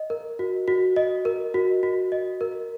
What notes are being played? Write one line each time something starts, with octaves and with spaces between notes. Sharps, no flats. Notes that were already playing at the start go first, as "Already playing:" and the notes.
Already playing: D#5
A#4
F#4
F#4
D#5
A#4
F#4
F#4
D#5
A#4